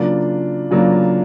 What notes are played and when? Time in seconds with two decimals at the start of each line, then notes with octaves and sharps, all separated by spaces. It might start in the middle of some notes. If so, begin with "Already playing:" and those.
Already playing: C#3 F#3 A#3 D4 F4
0.70 C#3 F#3 A#3 D4 F4